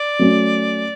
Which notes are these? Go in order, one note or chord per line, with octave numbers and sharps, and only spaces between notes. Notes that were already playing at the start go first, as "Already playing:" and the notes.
Already playing: D5
F#3 A3 C#4